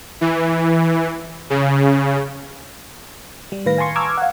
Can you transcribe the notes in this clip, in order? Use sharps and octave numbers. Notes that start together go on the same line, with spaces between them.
E3
C#3
G3
A2 D#3 B4 F5 A#6
F5 G#5 A5 C6 C#6
A#5 D6 E6 F6 G#6
F5 F#5